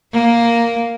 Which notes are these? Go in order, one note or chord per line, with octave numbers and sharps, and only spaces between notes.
A#3